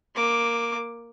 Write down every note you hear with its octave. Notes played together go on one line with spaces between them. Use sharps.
A#3 D6